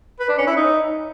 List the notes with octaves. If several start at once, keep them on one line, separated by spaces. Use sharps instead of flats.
B4
D4
C#4
E4
D#4